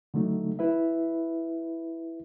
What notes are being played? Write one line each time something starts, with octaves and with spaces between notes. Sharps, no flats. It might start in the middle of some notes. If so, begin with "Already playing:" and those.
D3 F#3 A3 D#4
E4 B4 E5